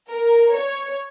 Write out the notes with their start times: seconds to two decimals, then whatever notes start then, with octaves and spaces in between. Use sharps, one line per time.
0.09 A#4
0.53 C#5